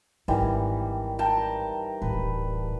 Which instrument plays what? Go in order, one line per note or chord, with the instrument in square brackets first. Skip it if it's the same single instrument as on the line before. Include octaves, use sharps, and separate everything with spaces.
[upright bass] G#1 [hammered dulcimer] D#3 E3 G3
[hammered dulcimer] A#4 G5 A5
[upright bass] D1 A1 [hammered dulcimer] B4